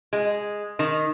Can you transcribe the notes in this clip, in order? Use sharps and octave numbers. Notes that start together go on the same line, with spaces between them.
G#3
D#3